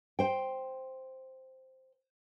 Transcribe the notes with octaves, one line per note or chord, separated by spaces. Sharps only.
C5 G5